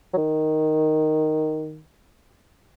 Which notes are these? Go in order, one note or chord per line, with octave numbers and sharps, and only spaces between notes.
F#3
D#3